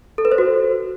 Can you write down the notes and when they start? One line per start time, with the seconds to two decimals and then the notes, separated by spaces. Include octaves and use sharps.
0.18 A4
0.25 B4
0.32 C5
0.38 F#4